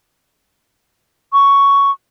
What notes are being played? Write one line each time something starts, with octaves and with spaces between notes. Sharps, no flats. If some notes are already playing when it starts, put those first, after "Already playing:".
C#6